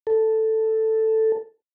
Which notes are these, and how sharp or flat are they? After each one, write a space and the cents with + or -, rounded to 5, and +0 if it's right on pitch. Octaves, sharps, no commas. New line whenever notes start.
A4 +5